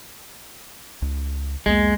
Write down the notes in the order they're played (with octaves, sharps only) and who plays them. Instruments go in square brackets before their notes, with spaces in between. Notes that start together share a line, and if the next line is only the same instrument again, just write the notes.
[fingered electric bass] C#2
[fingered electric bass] B1 E2 A#3 [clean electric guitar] G#3